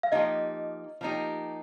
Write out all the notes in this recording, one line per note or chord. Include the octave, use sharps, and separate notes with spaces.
F5
F3 A#3 D#4 G4 D#5
F3 A#3 D#4 G4